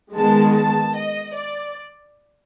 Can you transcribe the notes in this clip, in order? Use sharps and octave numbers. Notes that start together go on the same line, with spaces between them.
D#3 G#3 B3 A5
A5
D#5
D5